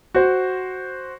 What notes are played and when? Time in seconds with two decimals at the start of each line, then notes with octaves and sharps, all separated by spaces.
0.15 F#4 C5